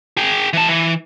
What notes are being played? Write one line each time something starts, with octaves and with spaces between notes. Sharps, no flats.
G#4 G5
E3 A5
E3